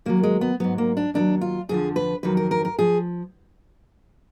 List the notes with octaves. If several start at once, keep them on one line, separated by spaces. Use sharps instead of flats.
D#2 D#3 F#3 A#3
G#3
B3
G#2 F#3 B3
A#3
D4
D#2 D#3 F#3 D4
F4
F2 D3 F3 G#4
B4
F2 D#3 F#3 B4
A#4
A#4
A#4
F3 G#4